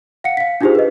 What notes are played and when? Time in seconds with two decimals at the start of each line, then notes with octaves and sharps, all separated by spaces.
0.24 F5 F#5 C#7
0.37 F5 B6
0.61 D4 D#4 F4 G4 G#4 C5
0.75 B4 D#5